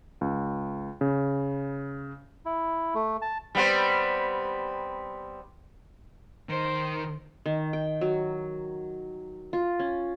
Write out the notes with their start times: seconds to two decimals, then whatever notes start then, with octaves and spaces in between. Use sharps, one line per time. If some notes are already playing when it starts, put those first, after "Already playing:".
0.21 C#2
1.01 C#3
2.45 E4
2.95 A3
3.22 A5
3.55 G3 B3 C4
6.49 D#3 C5
7.46 D#3
7.73 G5
8.01 F#3
9.53 F4
9.79 C#4